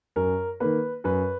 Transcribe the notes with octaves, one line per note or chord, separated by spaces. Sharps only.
F#2 A#4
D#3 A#3 B4
F#2 B4